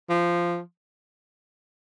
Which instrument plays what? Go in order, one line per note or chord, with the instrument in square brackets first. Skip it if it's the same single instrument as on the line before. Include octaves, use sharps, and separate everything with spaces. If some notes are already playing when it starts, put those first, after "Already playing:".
[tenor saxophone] F3